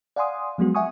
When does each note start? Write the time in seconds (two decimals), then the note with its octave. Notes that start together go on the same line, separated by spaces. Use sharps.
0.16 D5 F5 F#5 G#5 C6 D#6
0.58 F3 F#3 G#3 B3 F#4
0.75 E5 F#5 G#5 C#6 D#6